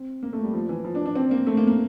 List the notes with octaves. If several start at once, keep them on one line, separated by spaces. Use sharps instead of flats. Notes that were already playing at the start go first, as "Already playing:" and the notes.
Already playing: C4
A#3
A3
G3
F3
E3
F3
D4
D4
C4
A#3
A3
A#3
A#3